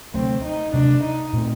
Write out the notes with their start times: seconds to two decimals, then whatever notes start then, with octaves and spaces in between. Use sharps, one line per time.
0.14 D2 C3 F#3 A3 C4
0.44 D#4
0.73 D2 C3 F#3 A3 D4
1.03 D#4
1.33 A#2 A3 C4